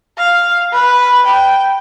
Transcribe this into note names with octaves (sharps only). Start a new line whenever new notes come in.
F5
B4
G5